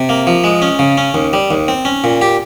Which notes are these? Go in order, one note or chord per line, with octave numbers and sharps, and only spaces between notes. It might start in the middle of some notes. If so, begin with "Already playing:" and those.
Already playing: C3
A#3
F3
G#3
C#4
C#3
C#4
D#2
G3
D#2
C4
C#4
A#2
G4